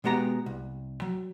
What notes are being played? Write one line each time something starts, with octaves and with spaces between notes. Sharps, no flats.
B2 G#3 B3 G4 A#5
C2
F#3